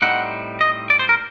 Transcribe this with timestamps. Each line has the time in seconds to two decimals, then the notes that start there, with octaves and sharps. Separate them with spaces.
0.02 A2 G3 C4 D#4 F#5
0.61 D#5
0.90 D5
0.99 C5
1.09 A#4